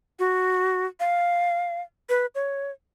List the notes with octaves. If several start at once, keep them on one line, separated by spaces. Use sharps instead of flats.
F#4
F5
B4
C#5